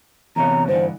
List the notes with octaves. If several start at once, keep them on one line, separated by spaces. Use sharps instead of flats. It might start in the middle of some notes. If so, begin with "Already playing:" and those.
E2 C3 C#5 A#5
G2 D3 E3 C5